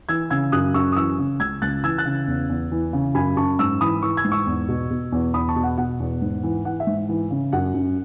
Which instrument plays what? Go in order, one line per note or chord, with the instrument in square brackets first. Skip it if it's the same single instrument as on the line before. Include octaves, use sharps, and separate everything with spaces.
[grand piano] E3 E6 G#6
C#3 E6 G#6
F#2 D#6 F#6
F#2 C#6 E6
D#6
E3 C#6 E6
C#3
C#2 E6 G#6
C#2 F#6 A6
E3 E6 G#6
F#6 A6
C#3
E2
E2
E3
C#3
F#2 G#5 B5
F#2 A5 C#6
G#2 C#6 E6
E3 B5 D#6
E3 C#6 E6
E6 G#6
G#2
C#6 E6
E2
B2
B2
E2
E2 B5 D#6
A5 C#6
B2
F#5
B2 F#5
E2
G#2
E3
E3 F#5
E5
G#2
E3
C#3
F#2 F#5
F#2